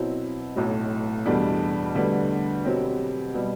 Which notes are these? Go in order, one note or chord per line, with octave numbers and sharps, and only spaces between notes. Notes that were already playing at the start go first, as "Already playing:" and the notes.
Already playing: B2 F#3 C4 E4
B1 A2 F#3
E2 B2 G3 D4 A4
D2 D3 G3 B3
B2 F#3 C4 G4
B2 G3